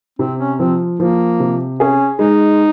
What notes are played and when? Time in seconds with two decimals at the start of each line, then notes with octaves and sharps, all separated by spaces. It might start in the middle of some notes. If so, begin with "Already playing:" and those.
0.19 C3 C4
0.39 C#4
0.59 F3 C4
0.99 F3 A#3
1.40 C3
1.79 C#4 G#4
2.19 G#3 D#4